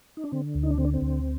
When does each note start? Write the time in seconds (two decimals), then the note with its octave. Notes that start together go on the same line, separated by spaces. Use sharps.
0.17 D#4
0.24 D4
0.32 D3 C4
0.55 D2
0.63 D#4
0.70 D4
0.78 D3 C4
0.85 D4
0.94 C4
1.01 D2